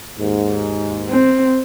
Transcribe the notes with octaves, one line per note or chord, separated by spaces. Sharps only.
D#2 G#2
C4